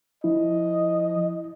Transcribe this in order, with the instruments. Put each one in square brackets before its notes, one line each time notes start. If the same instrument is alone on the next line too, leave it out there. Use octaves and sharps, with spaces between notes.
[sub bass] F3 [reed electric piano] E4 [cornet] D#5